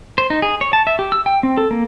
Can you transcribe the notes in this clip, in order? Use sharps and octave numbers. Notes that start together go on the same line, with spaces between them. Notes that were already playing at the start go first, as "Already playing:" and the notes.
C5
D#4
G#4
C#5
A5
E5
G4
E6
G5
C4
A4
A#3